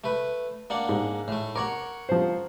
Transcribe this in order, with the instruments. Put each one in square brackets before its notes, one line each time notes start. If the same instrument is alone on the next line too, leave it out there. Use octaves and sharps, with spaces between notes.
[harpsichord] A3 B4
A#3 D4 F#5
[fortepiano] G#2
[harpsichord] A2 A3
[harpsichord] A#4 C#5 F#5 [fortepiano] D6
[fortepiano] F3 C5